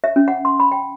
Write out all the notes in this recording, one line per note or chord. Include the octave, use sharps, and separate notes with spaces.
E5
C#4
F#5
C6
B5
G5